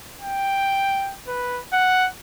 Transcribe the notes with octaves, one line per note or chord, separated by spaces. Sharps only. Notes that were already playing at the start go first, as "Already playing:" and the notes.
G5
B4
F#5